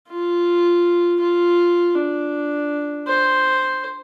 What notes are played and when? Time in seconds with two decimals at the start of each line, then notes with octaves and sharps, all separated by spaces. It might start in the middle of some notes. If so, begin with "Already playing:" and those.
0.09 F4
1.21 F4
1.95 D4
3.07 C5